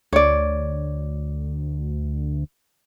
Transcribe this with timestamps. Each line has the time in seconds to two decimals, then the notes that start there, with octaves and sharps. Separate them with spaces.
0.13 D2 C#5 D5